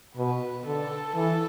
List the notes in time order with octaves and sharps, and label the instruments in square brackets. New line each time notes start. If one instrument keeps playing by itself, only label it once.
[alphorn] B2 [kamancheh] B4
[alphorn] D3 [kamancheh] A4
[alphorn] E3 [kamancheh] A4